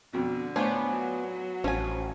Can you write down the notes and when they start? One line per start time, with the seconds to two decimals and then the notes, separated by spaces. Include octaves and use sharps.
0.13 F2 B2 D3
0.56 A2 B3 D4 F4 C5 C#5 G#5
0.90 F#3
1.64 A1 F3 C#4 G#5